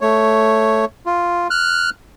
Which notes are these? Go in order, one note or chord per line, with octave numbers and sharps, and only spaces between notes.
A3 C#5
F4
F6 F#6